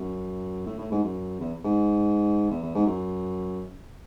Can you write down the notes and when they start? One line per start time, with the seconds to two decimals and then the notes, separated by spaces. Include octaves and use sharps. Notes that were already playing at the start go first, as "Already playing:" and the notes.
Already playing: F#2
0.67 A2
0.78 A2
0.92 G#2
1.03 F#2
1.40 E2
1.65 G#2
2.50 E2
2.62 E2
2.75 G#2
2.86 F#2